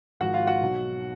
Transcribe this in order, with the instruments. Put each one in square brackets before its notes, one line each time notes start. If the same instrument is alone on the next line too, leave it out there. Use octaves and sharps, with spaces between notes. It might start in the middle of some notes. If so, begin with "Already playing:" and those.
[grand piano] G#1 G#2 F3 F#4 F#5
F4 F5
F#4 F#5
B1 B2 F#3